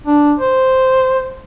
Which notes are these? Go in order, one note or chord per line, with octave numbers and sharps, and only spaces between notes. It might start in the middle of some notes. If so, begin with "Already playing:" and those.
D4
C5